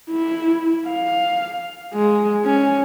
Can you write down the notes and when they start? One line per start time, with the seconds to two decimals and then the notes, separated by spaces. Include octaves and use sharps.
0.11 E4
0.88 F5
1.94 G#3
2.45 C#4